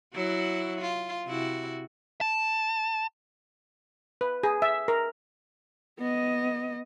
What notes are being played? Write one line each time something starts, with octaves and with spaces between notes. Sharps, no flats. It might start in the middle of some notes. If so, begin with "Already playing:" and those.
F#3 E4 F#4
F4
C3 E4 F#4
A5
B4
G#4
E5
A#4
B3 D#5